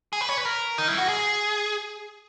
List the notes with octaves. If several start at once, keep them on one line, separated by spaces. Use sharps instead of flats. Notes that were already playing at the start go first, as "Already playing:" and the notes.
G#4
B4
C#5
B4
A#4
D#4
E4
F#4
G#4